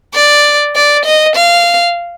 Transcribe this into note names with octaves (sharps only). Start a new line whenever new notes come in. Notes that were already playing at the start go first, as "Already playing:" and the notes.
D5
D5
D#5
F5